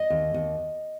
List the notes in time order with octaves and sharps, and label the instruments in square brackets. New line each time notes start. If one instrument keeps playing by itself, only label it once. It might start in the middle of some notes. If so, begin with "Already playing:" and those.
Already playing: [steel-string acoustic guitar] D#5
D#2
D#2